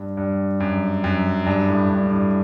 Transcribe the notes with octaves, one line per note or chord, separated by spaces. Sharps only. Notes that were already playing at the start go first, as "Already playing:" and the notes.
Already playing: G2
G2
F#2
F#2
G2
A2
G2
A2
G2